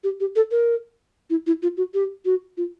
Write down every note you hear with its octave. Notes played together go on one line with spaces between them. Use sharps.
G4
G4
A4
A#4
E4
E4
F4
F#4
G4
F#4
F4